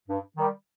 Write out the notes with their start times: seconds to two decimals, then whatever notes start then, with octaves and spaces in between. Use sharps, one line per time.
0.08 G2
0.37 D#3 G3